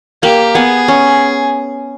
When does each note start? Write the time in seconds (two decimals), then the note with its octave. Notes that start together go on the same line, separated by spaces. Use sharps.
0.23 A#3 G4
0.55 B3 G#4
0.88 C#4